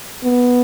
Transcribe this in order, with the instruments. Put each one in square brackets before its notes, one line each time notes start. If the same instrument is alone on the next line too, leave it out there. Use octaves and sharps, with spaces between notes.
[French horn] B3